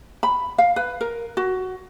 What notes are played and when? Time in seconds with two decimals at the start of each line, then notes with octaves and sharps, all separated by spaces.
0.23 B5
0.58 F5
0.76 B4
1.01 A#4
1.37 F#4